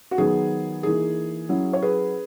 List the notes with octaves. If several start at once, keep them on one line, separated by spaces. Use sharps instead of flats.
F#4
D#3 F#3 B3 G#4
E3 A#3 D#4 G#4
F#3 C#4 E4
C#5
G#4 B4